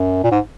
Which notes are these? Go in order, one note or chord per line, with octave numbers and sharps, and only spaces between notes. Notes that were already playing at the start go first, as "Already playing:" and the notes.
Already playing: F#2
A#2
G#2